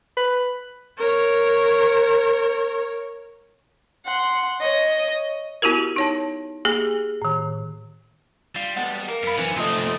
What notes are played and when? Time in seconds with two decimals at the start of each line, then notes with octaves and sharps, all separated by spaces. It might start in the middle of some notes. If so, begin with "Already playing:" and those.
0.17 B4
0.98 A#4 C#5
4.05 F#5 C6
4.61 C#5 D#5
5.62 B3 E4 F#4 G4 A#4
5.96 D#4 C#5 A5
6.65 A#3 G4 G#4
7.22 A2 D#3
8.56 G3 F4
8.76 G#3 B3 F#5 A5
9.08 A#3 A#4
9.24 F#2 B3 F5 B5
9.38 C3 E3
9.57 F3 A3 A#3 C4 A4 D#5